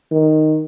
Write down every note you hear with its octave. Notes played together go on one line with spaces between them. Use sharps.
D#3